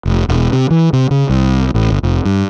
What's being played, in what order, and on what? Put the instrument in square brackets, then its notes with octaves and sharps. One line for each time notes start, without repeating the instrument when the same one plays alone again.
[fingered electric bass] F1
E1
C3
E3
C3
C#3
C2
A1
G1
F1
G2